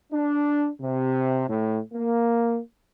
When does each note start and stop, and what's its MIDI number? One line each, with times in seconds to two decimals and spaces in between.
0.12 0.68 62
0.80 1.44 48
1.48 1.79 45
1.92 2.58 58